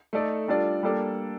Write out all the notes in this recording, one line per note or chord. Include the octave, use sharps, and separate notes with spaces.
A3 D#4 A4 D5
G3 D4 F4 A4 D5
G3 A#3 D4 A4 D5